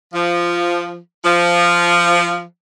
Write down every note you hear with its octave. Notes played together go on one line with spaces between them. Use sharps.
F3
F3